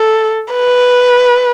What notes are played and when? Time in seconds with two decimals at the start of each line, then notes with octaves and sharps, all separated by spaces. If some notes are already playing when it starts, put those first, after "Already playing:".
Already playing: A4
0.53 B4